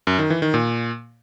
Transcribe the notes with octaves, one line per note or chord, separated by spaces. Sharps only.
F#2
D#3
E3
D#3
A#2